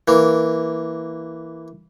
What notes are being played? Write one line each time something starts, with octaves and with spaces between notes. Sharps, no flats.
E3 A#3